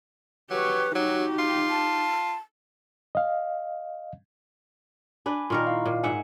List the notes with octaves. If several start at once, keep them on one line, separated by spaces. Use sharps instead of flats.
F#3 G4 B4 C#5
F#3 D#4 F#4 G4
F4
A5
D#5 F5
D4 B4 G#5 B5
A#2 D#3 A#4 C6 C#6 F6
E4 F5
A#2
G#2 E5 F#5 G#5